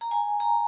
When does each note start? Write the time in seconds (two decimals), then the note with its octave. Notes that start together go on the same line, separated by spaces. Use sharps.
0.01 A#5
0.11 G#5
0.40 A#5